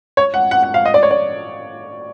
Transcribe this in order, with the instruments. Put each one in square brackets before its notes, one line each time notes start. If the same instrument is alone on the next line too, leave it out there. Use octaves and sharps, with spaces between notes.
[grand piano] C#5
F#5
F#5
F#5
F5
D#5
D5
C#5
D5